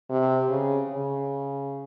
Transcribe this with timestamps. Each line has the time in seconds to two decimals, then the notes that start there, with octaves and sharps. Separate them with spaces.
0.10 C3
0.49 C#3
0.89 C#3